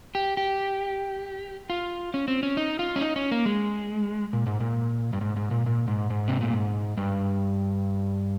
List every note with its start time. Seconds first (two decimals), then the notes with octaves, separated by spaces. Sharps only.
0.15 G4
0.37 G4
1.70 F4
2.14 C#4
2.28 C4
2.43 C#4
2.57 D#4
2.79 F4
2.96 C#4
3.01 D#4
3.16 C#4
3.31 A#3
3.46 G#3
4.33 A#2
4.46 G#2
4.60 A#2
5.13 G2
5.21 G#2
5.36 G#2
5.51 A#2
5.66 A#2
5.88 G#2
6.10 G#2
6.28 C3
6.41 A#2
6.53 G#2
6.97 G2